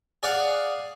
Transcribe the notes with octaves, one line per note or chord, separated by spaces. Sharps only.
G#4 D5 F5 F#5